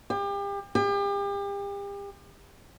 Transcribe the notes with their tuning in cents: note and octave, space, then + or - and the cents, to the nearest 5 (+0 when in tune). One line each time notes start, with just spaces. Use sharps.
G4 +35
G4 +40